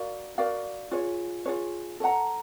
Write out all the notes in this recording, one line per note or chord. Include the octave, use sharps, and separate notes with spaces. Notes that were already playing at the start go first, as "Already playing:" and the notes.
Already playing: F#4 A#4 D5 F5
F#4 A#4 D5 F5
F4 G#4 C#5
F4 G#4 C#5
A4 C#5 F#5 A#5